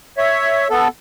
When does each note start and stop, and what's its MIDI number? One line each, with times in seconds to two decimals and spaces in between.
0.18 0.68 73
0.18 0.68 76
0.70 0.88 59
0.70 0.88 69